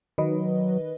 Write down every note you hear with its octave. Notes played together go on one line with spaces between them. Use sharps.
D#3 F#3 B4 D#5